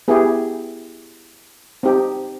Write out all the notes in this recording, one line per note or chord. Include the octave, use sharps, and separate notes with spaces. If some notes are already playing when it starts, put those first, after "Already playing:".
B3 E4 G4 G#4
C4 D#4 G4